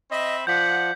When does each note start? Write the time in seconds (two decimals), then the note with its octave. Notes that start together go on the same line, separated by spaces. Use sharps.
0.11 C4 D#5 E5 B5
0.47 F3 D5 F#5 G6 B6